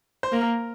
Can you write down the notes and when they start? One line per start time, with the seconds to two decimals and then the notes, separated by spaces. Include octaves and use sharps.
0.23 C5
0.32 A#3 A#4